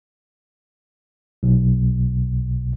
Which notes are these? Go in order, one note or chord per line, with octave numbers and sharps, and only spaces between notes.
B1 B2